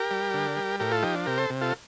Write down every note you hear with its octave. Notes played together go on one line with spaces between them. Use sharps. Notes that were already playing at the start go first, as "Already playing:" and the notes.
Already playing: G4 A#4
G3
D3
G3
A2 G4 A#4
F4 A4
F3 D#4 G4
D4
C3 G4 A#4
A4 C5
C3
F4 A4